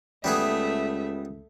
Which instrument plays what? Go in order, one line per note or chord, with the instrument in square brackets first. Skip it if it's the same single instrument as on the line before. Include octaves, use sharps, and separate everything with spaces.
[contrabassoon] C#2 [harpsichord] G3 B3 G#4 [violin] A3 E5